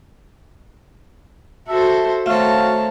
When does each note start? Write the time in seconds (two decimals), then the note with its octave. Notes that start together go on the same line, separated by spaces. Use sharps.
1.69 F#4 A4 C5 E5 A5
2.26 D#3 A3 C4 F#4 C#5 F5 A5